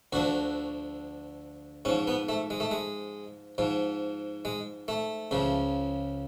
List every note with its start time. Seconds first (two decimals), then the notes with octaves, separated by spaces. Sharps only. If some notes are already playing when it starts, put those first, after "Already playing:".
0.13 D2 D3 F3 F#4
1.85 G#2 C#4
1.89 F3
2.07 B3
2.29 A3
2.50 G#3
2.60 A3
2.71 G#3
3.58 G#2 F3
4.45 G#3
4.88 A3
5.31 C#2 C#3 F3